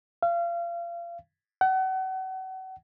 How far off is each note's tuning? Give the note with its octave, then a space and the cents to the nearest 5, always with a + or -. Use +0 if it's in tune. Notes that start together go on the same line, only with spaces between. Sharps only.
F5 -30
F#5 +35